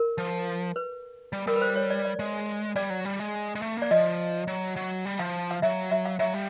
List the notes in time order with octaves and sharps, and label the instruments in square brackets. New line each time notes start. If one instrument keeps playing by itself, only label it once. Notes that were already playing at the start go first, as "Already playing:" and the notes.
Already playing: [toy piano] A#4
[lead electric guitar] F3
[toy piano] B4
[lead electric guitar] G3
[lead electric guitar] G3 [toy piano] A#4
[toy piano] B4
C5
C#5
D5
D5
[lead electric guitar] G#3
[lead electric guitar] G3 [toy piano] D5
[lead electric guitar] F#3
G3
G#3
G#3
A3
A#3
[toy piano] D5
[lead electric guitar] F3 [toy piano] D#5
[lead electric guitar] F#3
F#3
G3
[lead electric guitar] F3 [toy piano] F5
[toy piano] F5
[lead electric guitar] F#3 [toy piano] E5
[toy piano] E5
F5
[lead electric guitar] F#3 [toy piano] E5
[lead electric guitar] G3